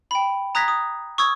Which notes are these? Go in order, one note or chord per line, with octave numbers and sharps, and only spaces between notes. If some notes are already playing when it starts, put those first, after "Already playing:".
G5 B5
A#5 D#6 F#6 G#6 A#6 B6
D#6
C#6 D#6 E6 G#6